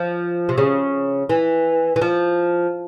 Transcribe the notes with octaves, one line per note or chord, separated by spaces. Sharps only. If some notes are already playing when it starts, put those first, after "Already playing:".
Already playing: F3
C3
C#3
E3
E3
F3